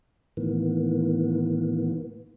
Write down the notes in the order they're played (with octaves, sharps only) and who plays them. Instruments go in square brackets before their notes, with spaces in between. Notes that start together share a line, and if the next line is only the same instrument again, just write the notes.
[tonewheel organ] A2 D#3 E3 A#3 B3